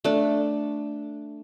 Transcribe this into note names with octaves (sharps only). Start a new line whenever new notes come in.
A3 D4